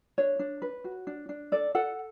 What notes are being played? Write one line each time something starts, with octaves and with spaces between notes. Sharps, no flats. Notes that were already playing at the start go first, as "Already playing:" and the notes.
D4 C#5
D4
B4
F#4
D4
D4
A4 D5
A4 F#5